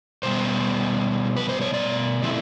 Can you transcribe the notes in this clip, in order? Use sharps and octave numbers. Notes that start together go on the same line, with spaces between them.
B2 G3 B3 C5
B4
C5
C#5
D5
A#2 F3 A3 C4 E4